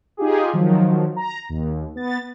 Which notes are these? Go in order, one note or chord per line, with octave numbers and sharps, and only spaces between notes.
D#4 F4 G4 G#4
D#3 F3 F#3
A#5
D#2
B3 A6